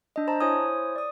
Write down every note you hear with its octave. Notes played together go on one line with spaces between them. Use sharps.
D4 D#5
C5 A5 A#5
E4 C5 C#5 G#5 D#6
D5 D#6